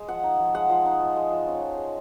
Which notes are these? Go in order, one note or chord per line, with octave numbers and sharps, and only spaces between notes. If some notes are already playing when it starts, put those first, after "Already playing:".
Already playing: G#3
F3 F#5
D#4
F3
G#3 F#5
F3
D#4
F3
G#3
F3
C#4
F3
G#3